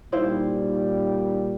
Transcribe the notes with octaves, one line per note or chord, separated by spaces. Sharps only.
A#2 G3 D#4 E4 C5 F5